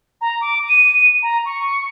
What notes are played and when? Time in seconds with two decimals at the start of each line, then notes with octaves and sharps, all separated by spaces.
0.21 A#5
0.41 D6
0.68 D#7
1.22 A#5
1.45 C#6